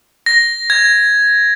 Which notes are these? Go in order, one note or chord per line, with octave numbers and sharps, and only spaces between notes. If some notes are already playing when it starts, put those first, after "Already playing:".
A#6
G#6